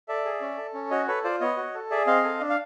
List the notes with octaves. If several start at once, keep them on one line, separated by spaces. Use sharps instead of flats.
A4 D5 E5
G#4
C#4
A4
C#4
F#4 C#5 D#5
A4 B4 C#5
F4 C5 D5
B3 C#5 D#5
F#4
A4
G#4 D5 E5
C4 D#5 F5
A4
D4
F5